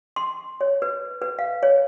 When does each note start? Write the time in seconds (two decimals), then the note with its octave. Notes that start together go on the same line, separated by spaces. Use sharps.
0.16 C6
0.61 C#5
0.82 B4
1.22 B4
1.39 F5
1.63 C#5